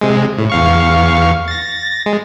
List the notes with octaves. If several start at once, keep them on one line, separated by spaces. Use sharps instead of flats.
C3 G#3
A2
E2 F5 C#6
A6 A#6
G#3